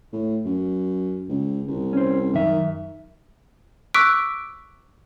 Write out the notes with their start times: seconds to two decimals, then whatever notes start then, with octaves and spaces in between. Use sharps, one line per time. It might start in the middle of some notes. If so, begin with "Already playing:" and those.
0.13 A2
0.45 F#2
1.29 C#2
1.68 C2
1.93 C#4 C5
2.33 F#2 D#3 E5
3.94 C#6 D6 E6 F#6 B6 D7